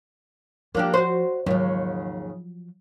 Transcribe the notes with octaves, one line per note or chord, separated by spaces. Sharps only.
F3 A#3 D4 G4
F#4 C5
D#2 G#2 C#3 F3 F#3